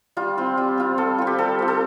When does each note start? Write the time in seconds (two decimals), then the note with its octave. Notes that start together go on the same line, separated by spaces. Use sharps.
0.17 G3 F4
0.37 C4 F4
0.57 G3
0.78 C4 F4
0.98 G3 A4
1.18 C4 F4
1.27 G4
1.38 G3 A4
1.59 C4 F4
1.68 A4